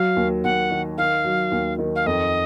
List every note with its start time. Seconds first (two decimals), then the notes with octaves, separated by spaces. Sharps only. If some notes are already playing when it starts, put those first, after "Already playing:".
Already playing: F#3 F5
0.17 D#2
0.44 D#2 F#5
0.71 D#3
0.98 D#3 F5
1.24 F#3
1.52 D#2
1.79 D#3
1.96 F5
2.06 F2 D#5